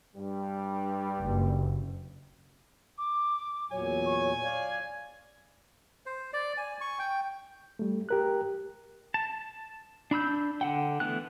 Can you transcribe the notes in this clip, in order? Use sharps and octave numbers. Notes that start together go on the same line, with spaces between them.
G2 G3
F#1
D6
E2 A#2 F#3 C#5 G#5
C#6
D5 F5 G#6
C5
D5
G#5
C#6
G5
G3 A3
G4 A#4 F#6
A5
D4 B5 E6 G6
D3 F#5 G5
E3 A3 B3 F#6